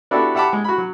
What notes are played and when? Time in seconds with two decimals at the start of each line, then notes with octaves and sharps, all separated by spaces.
0.11 B3 D4 E4 F#4 G4 A4
0.35 G4 E5 F#5 A5 B5 D6
0.53 G#3
0.64 F#4 B5
0.78 F#3